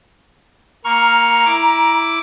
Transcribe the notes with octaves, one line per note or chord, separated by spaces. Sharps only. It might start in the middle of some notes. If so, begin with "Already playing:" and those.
A#3 A#5 C#6 F6
E4 D6